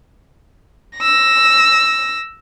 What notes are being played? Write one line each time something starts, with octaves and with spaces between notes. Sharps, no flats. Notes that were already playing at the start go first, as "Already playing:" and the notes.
E6 A#6